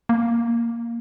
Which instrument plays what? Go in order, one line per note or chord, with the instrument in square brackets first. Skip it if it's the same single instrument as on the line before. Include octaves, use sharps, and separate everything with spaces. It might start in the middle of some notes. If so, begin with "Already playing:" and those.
[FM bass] A#3